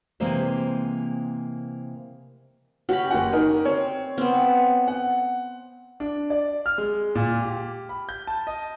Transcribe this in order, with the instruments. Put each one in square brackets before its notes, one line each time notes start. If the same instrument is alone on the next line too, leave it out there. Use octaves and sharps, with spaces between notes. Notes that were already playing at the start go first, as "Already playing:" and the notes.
[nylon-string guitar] C3 E3 G#3 A#3 C5 E5
[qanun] C#4 G4 B5 [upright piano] F#4
[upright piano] F#1 F#4 F#5
D#4 A#4
[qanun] C4 [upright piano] C#5
[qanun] B3 C4
[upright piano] F#5
[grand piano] D4
D5
F6
G#3
A#2
G4
B5
G6
A5
D#5